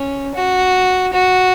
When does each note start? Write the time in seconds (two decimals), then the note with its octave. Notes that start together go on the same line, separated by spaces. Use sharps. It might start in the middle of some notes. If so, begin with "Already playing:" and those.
Already playing: C#4
0.34 F#4
1.13 F#4